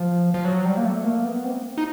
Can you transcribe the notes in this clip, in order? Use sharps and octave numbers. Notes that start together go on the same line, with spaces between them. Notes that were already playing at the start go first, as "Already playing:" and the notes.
Already playing: F3
F3
F#3
G3
A#3
A3
A#3
B3
C4
D#4